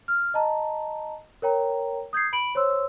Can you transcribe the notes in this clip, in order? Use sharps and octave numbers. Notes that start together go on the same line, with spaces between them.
F6
D#5 A5 A#5
A#4 C#5 G5 A#5
D#6 G6 G#6 C7
B5 D7 F#7
C5 C#5 C6 E6